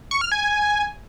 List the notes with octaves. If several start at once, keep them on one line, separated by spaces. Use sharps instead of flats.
C#6
F6
G#5